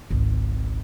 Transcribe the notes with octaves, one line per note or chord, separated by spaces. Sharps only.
G#1 C#2